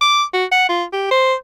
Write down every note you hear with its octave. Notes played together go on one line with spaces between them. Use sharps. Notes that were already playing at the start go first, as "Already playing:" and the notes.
D6
F#4
F#5
F4
G4
C5